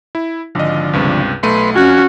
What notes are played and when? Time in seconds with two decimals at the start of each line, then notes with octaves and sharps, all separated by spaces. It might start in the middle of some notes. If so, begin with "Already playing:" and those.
0.15 E4
0.55 G#1 D3 F3 D#5
0.93 C#2 G2 C3
1.43 B1 A3 B4 C6 D#7
1.76 F2 C#4 F4 F#4 G#5 F#6